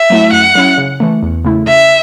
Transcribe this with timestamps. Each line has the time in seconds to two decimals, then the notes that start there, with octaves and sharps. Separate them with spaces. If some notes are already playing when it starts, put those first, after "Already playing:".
Already playing: E5
0.10 F#3 A3 E4
0.33 F#2 F#5
0.55 F#3 C#4 E4
0.78 C#3
1.00 E3 A3
1.22 E2
1.44 C#3 A3 E4
1.67 C#3 E5